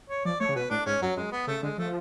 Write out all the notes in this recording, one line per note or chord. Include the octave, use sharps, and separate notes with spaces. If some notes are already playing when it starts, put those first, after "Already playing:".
C#5
F3 D5
A3 C#5
C#3
B2 B4
A2 D4
G#2 C#4
F#2 F#3
F#2 G#3
B3
C#3 A3
D3 G#3
F3 A3